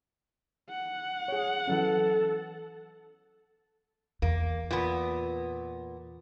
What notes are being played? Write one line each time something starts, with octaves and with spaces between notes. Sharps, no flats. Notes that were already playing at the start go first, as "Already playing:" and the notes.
F#5
G#4 C#5
E3 F#3 C#4 A4
E2 A#3
A#2 B3